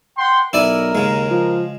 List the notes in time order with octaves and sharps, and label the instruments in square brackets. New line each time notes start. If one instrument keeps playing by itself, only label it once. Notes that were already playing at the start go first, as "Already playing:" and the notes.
[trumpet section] F#5 G5 C6
[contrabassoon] B1 [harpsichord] E4 D5 G#5 [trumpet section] A#4
[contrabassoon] D#2 [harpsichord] C#3 G#3
[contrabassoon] F3